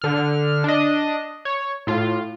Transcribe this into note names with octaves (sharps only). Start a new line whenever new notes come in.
D3 F6
D4 D#5
C#5
A2 F4